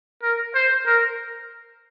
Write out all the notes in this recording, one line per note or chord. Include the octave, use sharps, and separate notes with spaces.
A#4
C5
A#4